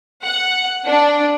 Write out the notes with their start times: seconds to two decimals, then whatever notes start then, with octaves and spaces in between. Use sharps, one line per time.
0.23 F#5
0.85 D4